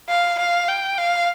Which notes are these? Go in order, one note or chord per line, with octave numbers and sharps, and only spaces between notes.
F5
F5
G5
F5